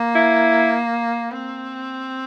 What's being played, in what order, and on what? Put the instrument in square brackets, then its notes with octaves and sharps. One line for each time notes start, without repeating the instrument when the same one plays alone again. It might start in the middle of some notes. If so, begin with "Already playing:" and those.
Already playing: [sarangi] A#3
[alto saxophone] E4
[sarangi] C4